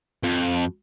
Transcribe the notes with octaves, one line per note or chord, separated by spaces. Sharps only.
F2